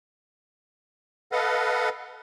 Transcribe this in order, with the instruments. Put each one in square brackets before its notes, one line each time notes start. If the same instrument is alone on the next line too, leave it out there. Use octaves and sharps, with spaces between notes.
[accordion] A4 B4 D#5 F5 F#5